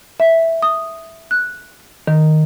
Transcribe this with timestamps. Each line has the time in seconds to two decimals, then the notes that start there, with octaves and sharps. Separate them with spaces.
0.20 E5
0.63 D#6
1.31 F#6
2.07 D#3